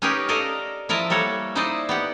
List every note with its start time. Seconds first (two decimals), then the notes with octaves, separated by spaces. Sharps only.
0.02 C#4 D#4 G4 G#4 A#4 B4
0.28 A4 A#4 D5 D#5 F5
0.89 F3 E4 A#4 D#5 A5
1.10 G3 A#3 A4 C#5 F#5
1.55 D#4 E4 G#4 C5 D5 D#5
1.89 B3 G4 F#5